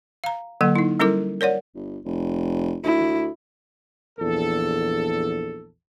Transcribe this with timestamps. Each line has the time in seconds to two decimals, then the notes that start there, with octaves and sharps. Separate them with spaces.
0.24 F5 A#5
0.61 D3 F#3 A#3 A4 F#5
0.76 D#4 E4
0.99 G3 C#4 E4 A4 A#4 D6
1.41 A#4 C#5 D5 F#5
1.75 G1
2.05 F1
2.84 D2 E4
4.18 A#1 E2 A4